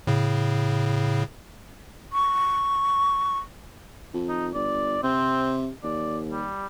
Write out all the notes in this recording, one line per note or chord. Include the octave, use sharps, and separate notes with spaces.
A2 C#3
C#6
F2
D#4
G1 D5
C3 C4
D#2 D5
G3